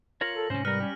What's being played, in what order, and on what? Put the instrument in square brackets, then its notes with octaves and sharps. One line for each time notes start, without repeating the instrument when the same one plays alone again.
[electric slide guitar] F4 A#4 C#5 [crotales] A#6 C#7 F#7
[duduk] A4
[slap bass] G#2 C3 [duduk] C#4 [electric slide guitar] C5
[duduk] G3 [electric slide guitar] A#4 B4 [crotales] F6 C#7
[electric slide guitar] C#4 G4